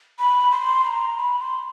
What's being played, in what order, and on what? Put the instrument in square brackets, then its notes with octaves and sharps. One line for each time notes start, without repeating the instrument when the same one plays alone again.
[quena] B5
C6
B5
A#5
B5
C6